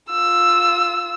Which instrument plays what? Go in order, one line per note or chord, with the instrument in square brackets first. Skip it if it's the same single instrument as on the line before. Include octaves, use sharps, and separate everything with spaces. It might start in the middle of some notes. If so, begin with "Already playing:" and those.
[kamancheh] F4 E6